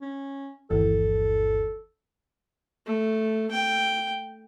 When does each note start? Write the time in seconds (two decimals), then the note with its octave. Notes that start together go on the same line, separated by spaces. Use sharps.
0.02 C#4
0.70 G1 D#2 E3 A4
2.87 A3
3.51 G5